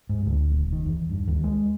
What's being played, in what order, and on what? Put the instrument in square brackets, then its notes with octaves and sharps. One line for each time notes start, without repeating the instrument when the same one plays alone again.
[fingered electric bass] G#2
D2
D#1
D#3
E2
G2
D#2
G#3